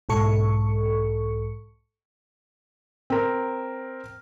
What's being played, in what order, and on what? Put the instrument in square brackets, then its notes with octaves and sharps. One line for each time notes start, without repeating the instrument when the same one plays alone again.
[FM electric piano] B1 G#2 A4 C#6 C#7
[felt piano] C4 A#4